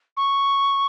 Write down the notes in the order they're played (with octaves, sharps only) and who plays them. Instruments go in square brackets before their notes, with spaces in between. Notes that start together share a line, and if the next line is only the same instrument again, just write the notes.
[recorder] C#6